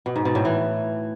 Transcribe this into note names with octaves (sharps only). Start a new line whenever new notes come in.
B2
G#2
B2
A2
E3